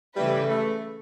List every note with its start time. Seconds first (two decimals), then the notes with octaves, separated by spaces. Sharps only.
0.16 C#3 E3 G3 A3 E4 B4
0.50 A3